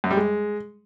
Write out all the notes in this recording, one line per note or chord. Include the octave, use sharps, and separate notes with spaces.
F#2
G3
G#3